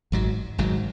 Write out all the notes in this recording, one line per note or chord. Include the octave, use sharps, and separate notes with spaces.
G#1 G#2 F#3
G#1 G#2 F#3